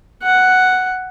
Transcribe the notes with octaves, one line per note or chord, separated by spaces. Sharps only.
F#5